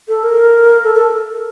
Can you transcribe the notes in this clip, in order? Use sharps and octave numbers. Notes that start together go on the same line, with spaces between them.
A4
A#4
A4
A4